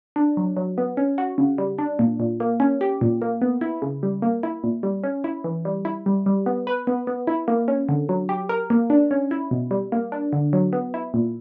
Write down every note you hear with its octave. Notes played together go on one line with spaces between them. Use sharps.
D4
F#3
F#3
B3
C#4
F#4
C#3
G3
D4
A#2
A#2
A#3
C#4
G4
A#2
A#3
B3
E4
C#3
G3
A#3
E4
A#2
G3
C#4
E4
E3
G3
E4
G3
G3
B3
B4
B3
B3
E4
A#3
C#4
D3
F#3
G4
A#4
A#3
D4
C#4
E4
B2
G3
A#3
D4
D3
F#3
B3
E4
A#2